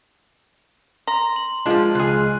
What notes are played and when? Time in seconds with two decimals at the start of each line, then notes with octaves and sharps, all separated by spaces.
1.07 A#5 C6
1.36 F#7
1.66 F3 G#3 D4 F4
1.95 C#2 G#4 F#6